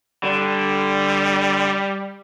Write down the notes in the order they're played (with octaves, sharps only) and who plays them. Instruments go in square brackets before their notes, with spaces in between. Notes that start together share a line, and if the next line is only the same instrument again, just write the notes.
[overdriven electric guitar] D3 [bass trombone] G3